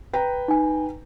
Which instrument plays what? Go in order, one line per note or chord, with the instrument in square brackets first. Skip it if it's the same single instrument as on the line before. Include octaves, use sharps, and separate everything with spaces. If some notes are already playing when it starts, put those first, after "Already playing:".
[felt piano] B4 G5 A#5
[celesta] D#4 G#5